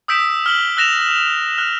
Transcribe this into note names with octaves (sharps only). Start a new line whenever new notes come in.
D#6 E6 G6 B6 D7 E7
F6 F#7 G7
E6 F#6 A#6 E7 F7
F6 F#6